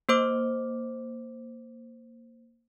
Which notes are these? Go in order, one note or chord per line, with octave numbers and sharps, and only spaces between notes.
A#3 C5 D6